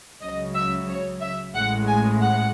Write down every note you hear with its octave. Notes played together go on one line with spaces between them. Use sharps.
C#2 C#3 F#3 D#5
E5
C#5
E5
A1 A2 G#3 F#5
G#5
F#5